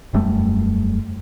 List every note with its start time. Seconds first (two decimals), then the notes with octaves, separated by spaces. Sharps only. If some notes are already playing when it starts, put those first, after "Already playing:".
0.13 E1 F#2 G3 A3